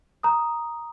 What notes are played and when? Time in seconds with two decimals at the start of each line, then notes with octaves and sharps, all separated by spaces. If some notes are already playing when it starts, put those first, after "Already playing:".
0.23 A#5 D#6